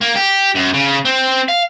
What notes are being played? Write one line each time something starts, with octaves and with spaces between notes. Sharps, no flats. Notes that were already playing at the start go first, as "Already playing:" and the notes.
A#3
G4
F#2
C#3
C4
F5